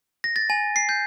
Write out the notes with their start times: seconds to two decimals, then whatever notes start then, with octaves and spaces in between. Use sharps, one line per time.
0.24 A#6
0.36 A6
0.50 G#5
0.76 C7
0.89 G6